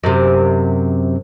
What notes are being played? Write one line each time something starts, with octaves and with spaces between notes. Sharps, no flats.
F#2 C3